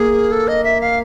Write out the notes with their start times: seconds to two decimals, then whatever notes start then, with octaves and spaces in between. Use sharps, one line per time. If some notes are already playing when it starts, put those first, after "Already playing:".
Already playing: A#3 G#4
0.32 A4
0.48 D#5
0.64 E5
0.81 F5